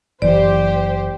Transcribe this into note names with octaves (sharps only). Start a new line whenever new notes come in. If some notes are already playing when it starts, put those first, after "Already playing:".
F#1 E3 G4 C5 D5